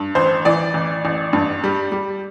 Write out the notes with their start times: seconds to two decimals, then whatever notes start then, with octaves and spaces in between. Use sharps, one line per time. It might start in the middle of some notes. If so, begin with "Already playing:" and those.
Already playing: G2
0.15 A1 C5
0.45 E3 D5
0.74 A1
1.05 A1
1.33 G2
1.64 G3
1.92 G3